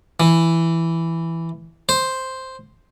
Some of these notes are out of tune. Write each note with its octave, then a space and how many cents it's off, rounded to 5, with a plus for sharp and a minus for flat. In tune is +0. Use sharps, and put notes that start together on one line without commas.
E3 +5
C5 +0